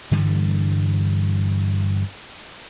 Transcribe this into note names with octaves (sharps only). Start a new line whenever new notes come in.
G2 D3 E3 G3